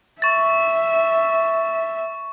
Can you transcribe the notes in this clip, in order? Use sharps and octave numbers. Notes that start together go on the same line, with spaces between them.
E5 C#6 A6